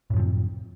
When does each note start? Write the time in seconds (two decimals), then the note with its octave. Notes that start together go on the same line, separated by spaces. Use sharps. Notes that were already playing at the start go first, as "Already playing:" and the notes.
0.10 A2
0.13 F#2
0.16 F3
0.19 C3